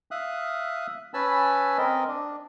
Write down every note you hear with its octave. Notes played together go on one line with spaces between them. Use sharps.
E5 F5 D#6 F#6
C#4 B4 G#5 A5 B5 E6
C4 A#4 D#5
D4